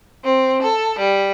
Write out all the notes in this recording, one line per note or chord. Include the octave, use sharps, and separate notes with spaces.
C4
A4
G3